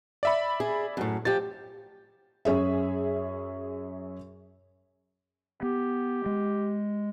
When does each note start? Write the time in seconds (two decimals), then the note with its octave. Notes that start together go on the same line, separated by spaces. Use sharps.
0.23 D5 E5 B5
0.60 G#4
0.97 F#2 A2
1.25 F3 G4 A6
2.45 F#2 C#4 G#4 E5
5.63 B3 G4
6.26 G#3